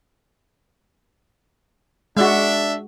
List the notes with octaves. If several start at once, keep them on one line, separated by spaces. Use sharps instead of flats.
G#3 D4 F#4 E5